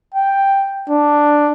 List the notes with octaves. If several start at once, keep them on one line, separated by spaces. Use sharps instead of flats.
G5
D4